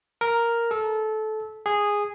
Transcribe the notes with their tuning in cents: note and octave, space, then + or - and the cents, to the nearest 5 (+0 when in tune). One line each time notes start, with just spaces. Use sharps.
A#4 +0
A4 -20
G#4 -10